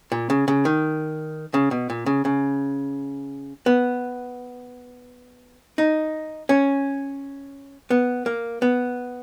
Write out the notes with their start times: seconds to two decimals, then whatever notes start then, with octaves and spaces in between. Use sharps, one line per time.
0.12 A#2
0.30 C#3
0.48 C#3
0.65 D#3
1.54 C#3
1.71 B2
1.90 A#2
2.06 C#3
2.25 C#3
3.66 B3
5.78 D#4
6.49 C#4
7.90 B3
8.26 A#3
8.62 B3